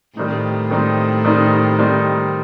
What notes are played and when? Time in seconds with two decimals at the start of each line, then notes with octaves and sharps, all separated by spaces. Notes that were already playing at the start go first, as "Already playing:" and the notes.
0.16 A2 D#3 G3 C4 D#4
0.71 D#3 G3 C4 D#4
1.25 D#3 G3 C4 D#4
1.79 D#3 G3 C4 D#4